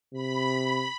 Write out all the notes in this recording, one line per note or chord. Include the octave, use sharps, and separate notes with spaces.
C3 B5